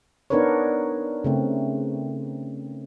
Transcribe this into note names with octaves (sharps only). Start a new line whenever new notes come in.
B3 D4 D#4 A#4 B4 C#5
C#3 A3 C4